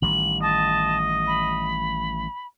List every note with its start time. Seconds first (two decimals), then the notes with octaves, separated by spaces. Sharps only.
0.02 A1 D#3 G3 F#7
0.42 D#5 A5
1.27 B5